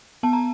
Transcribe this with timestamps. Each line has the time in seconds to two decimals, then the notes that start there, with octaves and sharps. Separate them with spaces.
0.23 B3 A5
0.33 A#5